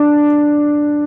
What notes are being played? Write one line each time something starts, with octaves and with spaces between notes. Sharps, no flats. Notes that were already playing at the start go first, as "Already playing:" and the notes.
Already playing: D4